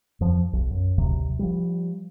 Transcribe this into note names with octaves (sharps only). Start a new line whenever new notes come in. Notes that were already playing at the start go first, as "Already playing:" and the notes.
F2 F3
B1
F#2
G#1 D2 C3 F#3
F3 G3